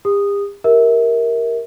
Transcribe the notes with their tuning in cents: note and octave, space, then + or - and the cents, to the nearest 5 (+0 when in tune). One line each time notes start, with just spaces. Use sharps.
G4 +45 D#6 -10
G4 +0 A#4 +0 E5 -35